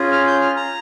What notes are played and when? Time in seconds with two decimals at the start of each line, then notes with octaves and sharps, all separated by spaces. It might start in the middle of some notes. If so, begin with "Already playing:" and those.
Already playing: C#4 F4 G#4
0.12 F6
0.27 G6
0.41 F6
0.56 A#5